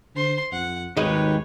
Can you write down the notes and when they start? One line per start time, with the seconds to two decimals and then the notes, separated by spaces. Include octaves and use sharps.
0.16 D3 C5 C6
0.52 F2 F#5
0.97 G#1 D#2 D#3 G#3 G4 B4 C#5 D#5